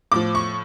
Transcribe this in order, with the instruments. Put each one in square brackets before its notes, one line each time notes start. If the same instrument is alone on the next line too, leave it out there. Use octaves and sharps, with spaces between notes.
[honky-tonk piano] A2 F3 D6
C#6